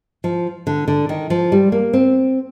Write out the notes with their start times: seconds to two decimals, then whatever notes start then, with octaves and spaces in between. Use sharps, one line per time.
0.24 F3
0.67 D3
0.88 D3
1.09 D#3
1.30 F3
1.52 G3
1.72 A#3
1.93 C4